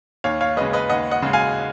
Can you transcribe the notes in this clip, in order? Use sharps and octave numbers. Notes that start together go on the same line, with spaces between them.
D#2 C#5 F5
C#5 F5
C#3 G#3 B4 D#5
B4 D#5
D#2 D#5 F#5
D#5 F#5
C#3 G#3
F5 G#5